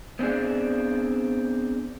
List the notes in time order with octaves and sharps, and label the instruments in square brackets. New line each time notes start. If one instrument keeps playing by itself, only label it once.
[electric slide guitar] B3 C4 D4 G#4